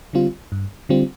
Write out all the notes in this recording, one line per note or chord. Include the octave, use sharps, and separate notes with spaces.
D3 G3 C4 F4
G2
D3 G3 C4 F4